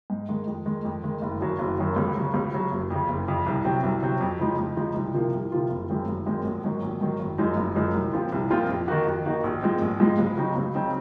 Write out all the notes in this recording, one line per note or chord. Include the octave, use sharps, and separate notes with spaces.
G#2
D#3 G#3
F2
D#3 G#3
F2
D#3 G#3
F#1
F#2 D#3 F#3
F#1
F#2 D#3 F#3
C#2
C#3 F#3
C#2
C#3 F#3
F#1
F2 C#3
F#1
F2 C#3
C2
C3 F#3 C4
C2
C3 F#3 C4
F2
C#3 F3 G#3 D#4
F2
C#3 F3 G#3 D#4
C2
C3 F3 A#3 F4
C2
C3 F3 A#3 F4
F#1
F#2 D#3 G#3 C4
F#1
F#2 D#3 G#3 C4
A#1
G#2 D#3 F#3
A#1
G#2 D#3 F#3
F#1
F#2 F3 G#3 D#4
F#1
F#2 F3 G#3 D#4
C2
A#2 F3 C4 F4
C2
A#2 F3 C4 F4
F2
D#3 A#3 D#4 F#4
F2
D#3 A#3 D#4 F#4
A#1
G#2 F3 G#3 C4
A#1
G#2 F3 G#3 C4
C#2
C#3 F#3 C4 D#4
C#2
C#3 F#3 C4 D#4